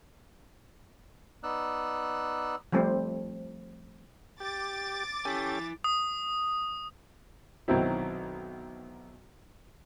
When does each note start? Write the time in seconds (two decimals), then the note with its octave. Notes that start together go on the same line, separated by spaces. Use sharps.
1.43 B3 D#4 D5 E6 F#6
2.72 F3 G3 A3 C4
4.40 G4 D6 A6
5.25 C#4 E4 G4 A4 G#5
5.84 D#6
7.68 B1 D#3 F#3 C4 E4